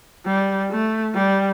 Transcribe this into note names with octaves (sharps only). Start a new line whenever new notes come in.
G3
A3
G3